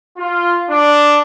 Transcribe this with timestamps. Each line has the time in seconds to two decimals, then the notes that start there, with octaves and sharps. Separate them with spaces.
0.18 F4
0.69 D4